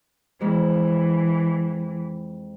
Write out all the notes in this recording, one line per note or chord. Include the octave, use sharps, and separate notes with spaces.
F2 E3 G#3 B3